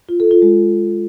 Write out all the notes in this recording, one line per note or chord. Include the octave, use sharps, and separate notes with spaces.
F4
A4
F4
G#3